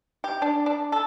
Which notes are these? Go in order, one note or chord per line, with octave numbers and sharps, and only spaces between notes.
G4
D4
D4
A4